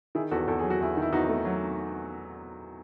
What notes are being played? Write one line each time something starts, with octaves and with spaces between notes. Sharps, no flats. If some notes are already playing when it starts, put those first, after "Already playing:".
D#3 E4 G#4
E2 F#4 A4
E2 A4
F#3 G#4
F#4
E2 E4 G#4
D#3
E4
E2 D#4 F#4
A3
F#3